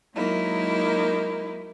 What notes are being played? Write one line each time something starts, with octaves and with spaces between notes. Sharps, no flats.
F#3 G#3 A#3 D#4 E4